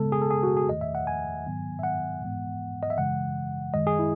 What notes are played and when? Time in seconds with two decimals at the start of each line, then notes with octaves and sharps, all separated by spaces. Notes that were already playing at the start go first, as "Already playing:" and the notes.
Already playing: C#3 G#3 B3 A4
0.12 G#4
0.22 A4
0.31 G#4
0.43 F#4
0.57 G#4
0.69 E2 D#3 A3 D#5
0.81 E5
0.95 F#5
1.07 G#5
1.45 G#2 D#3 F#3 B3
1.79 E5
1.83 F#5
2.21 G#2 E3 G#3 B3
2.83 D#5
2.90 E5
2.97 F#2 C#3 E3 G#3 F#5
3.74 F#2 D#3 G#3 D#5
3.87 G#4
3.99 E4